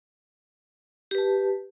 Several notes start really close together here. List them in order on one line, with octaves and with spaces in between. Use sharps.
G4 B4 A5